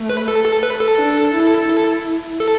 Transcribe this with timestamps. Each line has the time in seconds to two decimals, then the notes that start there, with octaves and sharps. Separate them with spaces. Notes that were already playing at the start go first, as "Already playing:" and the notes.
Already playing: A3
0.09 B4
0.28 A4
0.45 A4
0.63 B4
0.80 A4
0.98 D4
1.34 E4
1.70 E4
2.40 A4